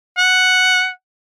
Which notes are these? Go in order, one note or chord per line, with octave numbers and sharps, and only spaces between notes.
F#5